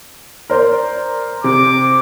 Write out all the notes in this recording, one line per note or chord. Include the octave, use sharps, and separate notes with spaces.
A#4 C5 D5
C3 D6